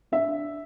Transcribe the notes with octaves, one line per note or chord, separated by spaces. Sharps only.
D4 E5